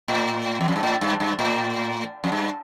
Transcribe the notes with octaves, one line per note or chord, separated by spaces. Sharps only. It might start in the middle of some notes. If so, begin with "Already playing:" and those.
A2
E2
F2
G2
A2
G2
G2
A2
F2
G2